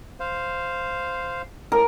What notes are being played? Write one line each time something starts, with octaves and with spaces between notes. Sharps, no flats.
C5 F5
A2 A#4